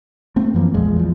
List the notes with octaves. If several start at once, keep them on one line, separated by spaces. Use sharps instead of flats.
A3 C4
F#2 E3 F3 A#3
A#1 E2 F3 G#3
E2 F3